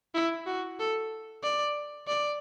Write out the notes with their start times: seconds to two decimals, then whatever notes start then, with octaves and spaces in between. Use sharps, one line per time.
0.15 E4
0.47 F#4
0.79 A4
1.43 D5
2.07 D5